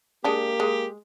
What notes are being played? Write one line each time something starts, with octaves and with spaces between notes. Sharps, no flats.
G#3 A#3 D4 G4
G#3